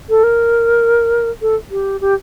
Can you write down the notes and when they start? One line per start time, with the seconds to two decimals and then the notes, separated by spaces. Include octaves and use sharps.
0.09 A4
0.23 A#4
1.42 A4
1.71 G4
2.01 G4